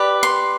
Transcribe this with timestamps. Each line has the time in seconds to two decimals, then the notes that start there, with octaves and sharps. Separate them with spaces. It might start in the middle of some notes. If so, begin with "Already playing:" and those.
Already playing: G4 B4 D5
0.23 C6